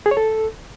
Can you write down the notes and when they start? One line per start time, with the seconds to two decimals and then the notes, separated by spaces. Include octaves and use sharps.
0.06 G#4
0.11 C#5
0.17 A4